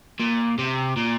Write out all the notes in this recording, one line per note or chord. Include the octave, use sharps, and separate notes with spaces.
A#2
C3
A#2